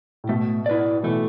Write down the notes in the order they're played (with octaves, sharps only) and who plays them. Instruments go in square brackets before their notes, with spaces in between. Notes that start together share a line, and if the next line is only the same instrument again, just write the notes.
[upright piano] A2
[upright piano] B2 [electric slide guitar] A3
[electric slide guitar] E4 B4 D5
[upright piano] B2 E3 [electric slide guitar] A3